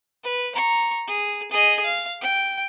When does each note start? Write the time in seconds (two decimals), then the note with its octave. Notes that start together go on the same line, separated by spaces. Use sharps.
0.24 B4
0.55 A#5 C#6
1.07 G#4
1.51 G#4 D#5
1.85 F5
2.21 G5